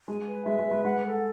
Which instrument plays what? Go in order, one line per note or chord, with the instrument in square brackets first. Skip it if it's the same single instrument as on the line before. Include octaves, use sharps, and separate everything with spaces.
[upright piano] G#3 [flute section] G#5
[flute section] B4
[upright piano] G#3 [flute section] E5
[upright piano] G#3
[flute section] B4
[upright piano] G#3
[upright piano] G#3 [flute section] F#5
[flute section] A4